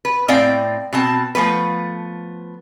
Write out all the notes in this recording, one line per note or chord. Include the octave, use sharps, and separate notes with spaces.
B4
A2 C4 D5 F5 G5
B2 C4 A5
F3 A3 B3 B4